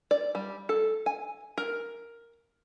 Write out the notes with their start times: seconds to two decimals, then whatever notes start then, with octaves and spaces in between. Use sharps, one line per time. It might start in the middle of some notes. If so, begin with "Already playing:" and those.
0.11 D5
0.35 G3
0.69 A4
1.06 G#5
1.58 A#4